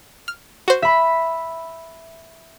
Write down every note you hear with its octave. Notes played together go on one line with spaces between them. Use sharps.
F6
F#4 C5
E5 B5